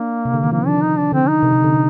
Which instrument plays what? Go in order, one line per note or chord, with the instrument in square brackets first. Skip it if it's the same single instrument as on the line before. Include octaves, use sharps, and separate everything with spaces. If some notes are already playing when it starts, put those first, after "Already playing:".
Already playing: [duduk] A#3 [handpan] D4
[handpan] C3
D3
D#3
[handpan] F3 [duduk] A#3
[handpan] F3 [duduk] D4
[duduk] D#4
D4
[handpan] D3 [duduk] C4
[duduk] D#4
[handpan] C3
C3
D3
C3